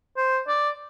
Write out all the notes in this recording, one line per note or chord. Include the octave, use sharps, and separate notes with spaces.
C5
D5